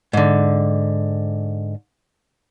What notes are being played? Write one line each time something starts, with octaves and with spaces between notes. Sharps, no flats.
G#2 D3